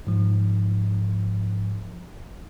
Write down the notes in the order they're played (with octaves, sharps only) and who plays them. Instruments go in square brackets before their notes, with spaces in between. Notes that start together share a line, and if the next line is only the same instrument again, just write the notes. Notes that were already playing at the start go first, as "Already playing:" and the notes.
[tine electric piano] G#2 F3